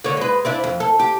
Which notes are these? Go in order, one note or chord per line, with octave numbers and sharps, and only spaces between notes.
D3 C#5
G#3 B4
C4 D4 E4
F2
A4
G4